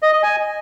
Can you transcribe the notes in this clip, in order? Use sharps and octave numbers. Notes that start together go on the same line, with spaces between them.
D#5
D#5
G#5